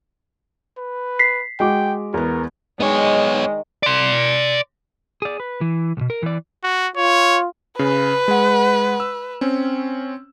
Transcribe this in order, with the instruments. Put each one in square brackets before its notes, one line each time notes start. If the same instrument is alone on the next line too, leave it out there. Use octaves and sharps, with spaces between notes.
[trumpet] B4
[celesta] B6 C7
[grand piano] G#3 F#4 D6 [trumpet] G5
[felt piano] E2 B3 [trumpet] A#4
[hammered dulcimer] D#3 D5 [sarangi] G#3 [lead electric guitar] B3 C#5
[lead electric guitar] D5 C6
G#4 D5
B4
E3
B1 B2
A#4
E3 D5
[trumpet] F#4
[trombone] F4 [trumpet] C#5
[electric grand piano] C#3 [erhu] B4
[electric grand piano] G#3 F#5
E6
C4 C#4